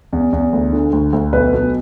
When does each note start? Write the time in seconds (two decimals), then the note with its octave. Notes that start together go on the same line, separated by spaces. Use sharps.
0.13 E2
0.33 E2
0.53 D2
0.72 D3
0.92 D2
1.13 D2
1.33 B1 B4
1.53 B2